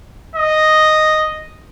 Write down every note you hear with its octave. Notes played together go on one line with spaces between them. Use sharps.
D#5